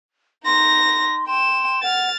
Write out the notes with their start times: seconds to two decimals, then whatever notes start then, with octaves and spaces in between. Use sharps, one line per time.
0.45 D#4 C6 A#6
1.28 G5 C6 E7
1.83 F#5 F6 A6